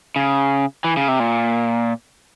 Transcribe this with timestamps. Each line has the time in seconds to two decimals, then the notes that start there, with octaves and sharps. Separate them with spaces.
0.16 C#3
0.84 E3
0.97 C#3
1.08 C3
1.20 A#2